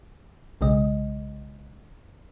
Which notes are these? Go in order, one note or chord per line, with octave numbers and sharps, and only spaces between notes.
B1 C#3 G#3 D#5